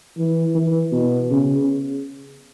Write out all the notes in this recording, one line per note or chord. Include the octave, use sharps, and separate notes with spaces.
E3
E3
B2
C#3